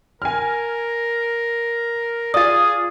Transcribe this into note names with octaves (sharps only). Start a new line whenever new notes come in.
A#4 G#5 F6
F4 G#4 D5 D#6 A6